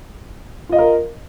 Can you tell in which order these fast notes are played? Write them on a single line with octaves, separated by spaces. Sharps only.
F4 D#5 F5 A#4